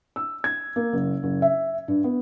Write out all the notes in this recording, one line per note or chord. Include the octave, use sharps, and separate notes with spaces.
E6
G#6
A#3
F#1
F#1
E5
G2
B3